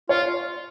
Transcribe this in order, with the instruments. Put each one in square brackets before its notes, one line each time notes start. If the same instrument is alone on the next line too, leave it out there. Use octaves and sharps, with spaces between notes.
[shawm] F4 [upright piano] C#5